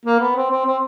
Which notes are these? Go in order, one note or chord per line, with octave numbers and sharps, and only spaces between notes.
A#3
B3
C4
C4
C4